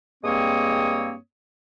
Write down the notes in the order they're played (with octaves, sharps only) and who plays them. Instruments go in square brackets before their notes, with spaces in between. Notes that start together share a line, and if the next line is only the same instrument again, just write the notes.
[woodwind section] G2 G#3 A#3 C4 C#5 D#6